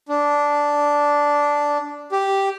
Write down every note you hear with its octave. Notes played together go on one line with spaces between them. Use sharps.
D4
G4